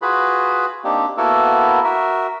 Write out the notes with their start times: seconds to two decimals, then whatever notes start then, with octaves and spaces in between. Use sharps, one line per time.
0.02 F4 F#4 G#4 B4 B5
0.84 A#3 C4 D4 D#4 G4
1.17 A#3 B3 E4 F#4 A4 A#4
1.84 F#4 A#4 E5